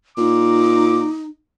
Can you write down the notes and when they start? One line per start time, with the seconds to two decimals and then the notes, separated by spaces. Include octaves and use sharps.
0.18 A#2 D#4 D6